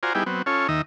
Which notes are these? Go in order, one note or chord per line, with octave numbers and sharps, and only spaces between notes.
F4 F#4 C5 D5 G#5 A#5
G3 B3 D#4 E4 G4 G#4
F#3 B3 C4
C#4 F4 A4 C#5
D#2 D#3 E5 A#5 D#6